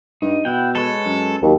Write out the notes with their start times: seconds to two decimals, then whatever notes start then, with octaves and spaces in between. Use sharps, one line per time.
0.22 G2 D#4
0.45 B2 E4 F#5 G5
0.75 G#3 A4 B4 C#5
1.05 F#2
1.43 D#2 F#3